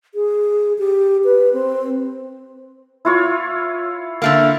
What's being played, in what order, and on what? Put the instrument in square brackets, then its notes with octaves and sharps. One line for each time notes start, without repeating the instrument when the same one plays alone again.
[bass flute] G#4
G4
B4
C4
[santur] E4 F4 C#5
[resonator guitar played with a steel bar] D3 A3 A#3